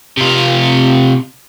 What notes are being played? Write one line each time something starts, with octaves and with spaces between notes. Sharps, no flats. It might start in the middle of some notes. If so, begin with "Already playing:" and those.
C3 F4